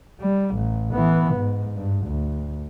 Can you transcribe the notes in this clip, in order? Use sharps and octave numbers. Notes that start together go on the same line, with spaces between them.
G3
A1
E3 B3
G#2
G2
D2